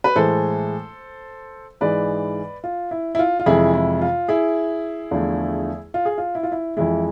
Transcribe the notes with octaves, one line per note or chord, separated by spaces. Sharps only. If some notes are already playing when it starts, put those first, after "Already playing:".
B4
A2 E3 G#3 A4 C5
G#2 E3 G#3 B4 D5
F4
E4
E4
F4
F4
F2 C3 E3 G#3 E4 G#4
E4
F4
E4 G#4
E2 D3 F3 A3
F4
G#4
F4
E4
F4
E4
F2 E3 G#3 E4